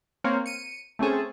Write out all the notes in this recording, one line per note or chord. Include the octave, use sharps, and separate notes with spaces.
A#3 C4 C#5
C#7 D#7
A3 C4 C#4 G#4 A4